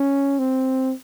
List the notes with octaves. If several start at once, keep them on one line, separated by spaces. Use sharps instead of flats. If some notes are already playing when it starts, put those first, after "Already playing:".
Already playing: C#4
C4